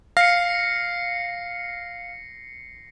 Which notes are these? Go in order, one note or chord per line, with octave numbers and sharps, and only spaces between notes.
F5 A#6 C7 C#7